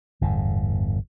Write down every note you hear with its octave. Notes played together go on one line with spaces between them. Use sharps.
G1 E2 A2